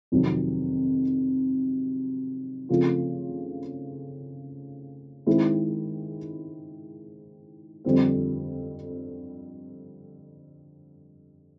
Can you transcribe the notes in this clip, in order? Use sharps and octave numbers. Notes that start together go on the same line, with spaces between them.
F2 C3 D#3 F#3
C#3 F3 A3 C4 F4
D#3 G#3 C4 E4
F2 D3 G3 C4